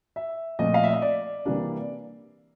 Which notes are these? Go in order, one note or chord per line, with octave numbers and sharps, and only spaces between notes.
E5
A#2 F3 A3 C4 D#5
F5
E5
D#5
D5
C3 E3 G3 A#3 D4